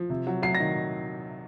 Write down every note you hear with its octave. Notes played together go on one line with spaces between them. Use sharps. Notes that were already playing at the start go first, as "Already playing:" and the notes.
Already playing: F3
C3
F#3
F#3 C7
D#3 A#6